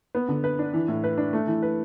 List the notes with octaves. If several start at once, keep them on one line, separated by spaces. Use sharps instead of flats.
B3
D3
B4
D4
E3
A2
B4
D4
A3
E3
B4